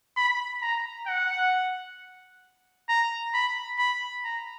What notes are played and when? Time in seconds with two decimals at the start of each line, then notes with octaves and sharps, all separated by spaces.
0.17 B5
0.62 A#5
1.07 F#5
2.89 A#5
3.34 B5
3.79 B5
4.24 A#5